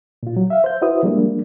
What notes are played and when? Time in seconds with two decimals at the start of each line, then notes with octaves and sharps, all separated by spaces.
0.23 A#2 F4
0.36 F#3
0.50 E5 F5
0.64 C5 G6
0.82 E4 F#4 B4 C5 E5 D#6
1.03 F3 G3 G#3 A#3 D4